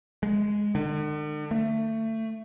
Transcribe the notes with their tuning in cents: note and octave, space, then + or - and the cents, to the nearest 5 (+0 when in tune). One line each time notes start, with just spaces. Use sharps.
G#3 +0
D3 +45
A3 +25